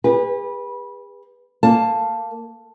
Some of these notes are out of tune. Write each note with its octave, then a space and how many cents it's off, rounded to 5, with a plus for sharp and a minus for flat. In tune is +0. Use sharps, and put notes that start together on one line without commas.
G#4 -45 B4 -20
A#3 -10 A5 +5